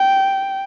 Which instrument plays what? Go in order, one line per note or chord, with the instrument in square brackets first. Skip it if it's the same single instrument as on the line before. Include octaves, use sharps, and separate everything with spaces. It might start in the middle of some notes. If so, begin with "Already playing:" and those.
Already playing: [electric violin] G5